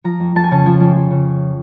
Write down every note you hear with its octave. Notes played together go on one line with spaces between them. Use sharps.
F3 A#5
F2
F2 A5
G#5
C#3 A5
F3 G#5
F2
F2
C#3